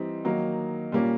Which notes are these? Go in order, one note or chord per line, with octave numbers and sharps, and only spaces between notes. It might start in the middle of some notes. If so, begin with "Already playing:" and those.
Already playing: E3 G3 C4 D#4
D#3 F#3 A#3 D#4
A#2 G3 A#3 C#4